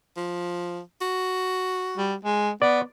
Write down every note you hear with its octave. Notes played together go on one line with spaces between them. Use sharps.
F3
F#4
G3
G#3
B3 D5